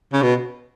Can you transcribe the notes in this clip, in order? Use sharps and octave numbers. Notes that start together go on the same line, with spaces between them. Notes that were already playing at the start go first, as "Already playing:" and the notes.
C#3
B2